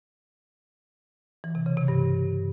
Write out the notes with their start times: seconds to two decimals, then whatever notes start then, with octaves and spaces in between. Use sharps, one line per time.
1.44 E3
1.55 C3
1.66 C#3
1.77 C3
1.88 G2